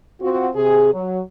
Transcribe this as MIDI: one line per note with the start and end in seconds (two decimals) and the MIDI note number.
0.22 0.48 60
0.22 0.48 65
0.22 0.48 66
0.55 0.91 48
0.55 0.91 68
0.93 1.20 54